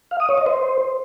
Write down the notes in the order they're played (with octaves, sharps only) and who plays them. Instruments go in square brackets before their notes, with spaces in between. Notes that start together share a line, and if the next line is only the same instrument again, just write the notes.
[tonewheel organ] F5
D#6
C#5
D#5
C5